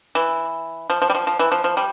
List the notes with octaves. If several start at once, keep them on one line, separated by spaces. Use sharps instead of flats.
E3
F3
F3
G3
F3
F3
E3
F3
F3
G3